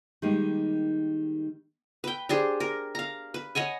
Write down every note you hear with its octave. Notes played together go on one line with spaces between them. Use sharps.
D#3 G3 G#3 A#3 D#4
B4 G5
D4 G4 G#4 C5
A#4
F5 A#5
B4
C#5 D#5 F#5 G#5